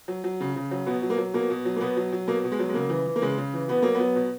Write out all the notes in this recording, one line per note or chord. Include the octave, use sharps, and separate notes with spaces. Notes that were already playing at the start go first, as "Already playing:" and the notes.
F#3
F#3
C#3
C#3
F#3
B2 B3
F#3
A#3
F#3
B2 A#3
B2
F#3
A#3
B2 B3
F#3
F#3
B2 A#3
B2
G#3
F#3
G#3
C#3 A#3
E3
E3
A#3
C#3 G#3
C#3
E3
B2 B3
F#3 A#3
B3
F#3
B2